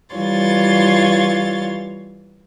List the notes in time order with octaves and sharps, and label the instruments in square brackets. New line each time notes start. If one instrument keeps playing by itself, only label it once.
[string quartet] E3 G3 F4 C#5 C6 A6